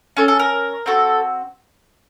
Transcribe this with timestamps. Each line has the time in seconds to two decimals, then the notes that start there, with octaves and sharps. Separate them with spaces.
0.17 C#4 A4
0.28 A4
0.39 A#4
0.86 C4 F#4 A4